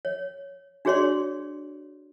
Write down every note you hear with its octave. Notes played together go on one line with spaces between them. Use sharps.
C#5
D4 F#4 G#4 C#5 D5 C6